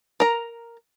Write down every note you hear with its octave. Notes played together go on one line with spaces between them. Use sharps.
A#4 A#5